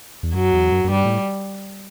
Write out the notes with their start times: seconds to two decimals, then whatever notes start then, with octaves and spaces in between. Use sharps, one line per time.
0.23 E2
0.34 F#2 F#3
0.53 E2
0.72 F#2
0.84 F#2
0.90 G2 G3
1.05 A2